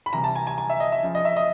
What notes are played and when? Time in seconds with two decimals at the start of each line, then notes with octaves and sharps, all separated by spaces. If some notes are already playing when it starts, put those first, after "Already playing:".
0.06 B5
0.13 C3 E3 G3 A#5
0.24 A5
0.36 G#5
0.47 G#5
0.58 G#5
0.70 E5
0.80 D#5
0.92 E5
1.03 C#3 F3
1.15 D#5
1.25 E5
1.37 D#5